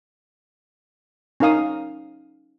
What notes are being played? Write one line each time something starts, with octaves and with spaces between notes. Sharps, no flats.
C#4 D#4 A#4 F5 D#6